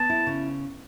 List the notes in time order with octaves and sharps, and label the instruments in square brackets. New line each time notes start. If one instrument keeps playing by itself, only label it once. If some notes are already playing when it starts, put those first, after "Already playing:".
Already playing: [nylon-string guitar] B3 [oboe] A5
[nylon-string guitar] E4
C#3